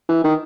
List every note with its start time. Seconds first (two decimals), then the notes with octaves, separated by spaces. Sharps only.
0.09 E3
0.24 D#3